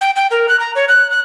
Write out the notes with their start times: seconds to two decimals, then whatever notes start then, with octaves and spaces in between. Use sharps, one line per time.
0.01 G5
0.16 G5
0.31 A#4
0.49 F#6
0.60 A#5
0.75 C#5
0.89 F#6
1.10 F#6